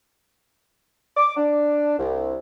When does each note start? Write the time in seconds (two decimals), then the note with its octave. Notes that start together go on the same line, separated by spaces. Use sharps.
1.17 D6
1.36 D4
1.97 C2